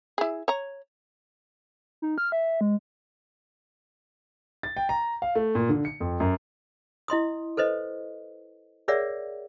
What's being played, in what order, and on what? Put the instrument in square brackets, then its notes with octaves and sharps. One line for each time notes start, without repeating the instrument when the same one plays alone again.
[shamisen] E4 G#4
C#5 A#5
[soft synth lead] D#4
F6
E5
G#3
[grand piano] A6
G5
A#5
F5
A3
A#2
D3
C#7
F2
F#2
[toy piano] E4 D#5 C6 D#6
A4 B4 C5 D#5
G#4 A#4 C#5 D5 E5 F#5